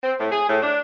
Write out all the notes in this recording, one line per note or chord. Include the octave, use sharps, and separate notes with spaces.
C4
A2
G#4
A2
D4